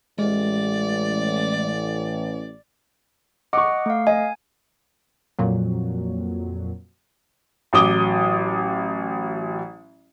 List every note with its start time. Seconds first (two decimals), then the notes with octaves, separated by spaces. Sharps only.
0.19 A1 G#3 D5
3.53 D#5 F#5 C#6 D6
3.86 A3 F5
4.07 D#5 G#5
5.39 F2 A#2 F#3
7.73 A1 F#3 D6 D#6 G7